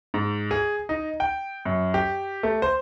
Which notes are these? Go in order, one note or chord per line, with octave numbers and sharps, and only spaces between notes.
G#2
G#4
D#4
G5
F#2
G4
A3
C5